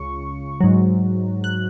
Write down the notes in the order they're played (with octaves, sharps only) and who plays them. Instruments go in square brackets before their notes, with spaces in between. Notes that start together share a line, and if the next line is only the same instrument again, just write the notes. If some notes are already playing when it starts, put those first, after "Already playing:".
Already playing: [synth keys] C#2 C#3 C#6
G#2 F#3
F#6